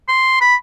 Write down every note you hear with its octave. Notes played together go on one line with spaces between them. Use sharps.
C6
B5